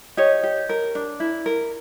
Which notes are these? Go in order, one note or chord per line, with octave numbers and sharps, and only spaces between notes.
G4 C#5 D#5
G4
A#4
D4
E4
A#4